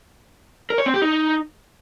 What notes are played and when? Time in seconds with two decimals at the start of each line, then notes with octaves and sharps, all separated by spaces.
0.70 A#4
0.78 C#5
0.86 C4
0.94 G4
1.02 D#4